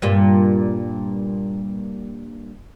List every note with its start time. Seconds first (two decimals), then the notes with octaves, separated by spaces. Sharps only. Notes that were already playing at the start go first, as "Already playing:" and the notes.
0.02 G2 A#2 G3